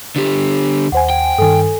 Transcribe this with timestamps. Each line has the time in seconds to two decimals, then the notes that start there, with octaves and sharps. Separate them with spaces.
0.16 D3 G4
0.92 D#2 C5 F#5 G#5
1.10 G5
1.38 G2 D#3 A4 G#5